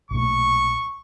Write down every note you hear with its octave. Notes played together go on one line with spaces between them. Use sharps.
B1 A#2 A3 C#6